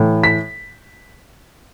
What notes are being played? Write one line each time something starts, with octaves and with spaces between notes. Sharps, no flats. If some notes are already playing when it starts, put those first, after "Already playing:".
Already playing: A2 E3
B6